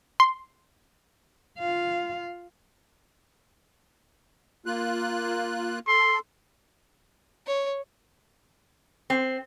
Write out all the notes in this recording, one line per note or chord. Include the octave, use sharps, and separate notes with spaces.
C6
F4 F5
A#3 F4 F#6
A4 C6
C#5
C4